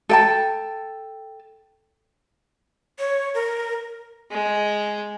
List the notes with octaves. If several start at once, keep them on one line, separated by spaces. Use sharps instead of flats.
A4 G5 A5
C#5
A#4
G#3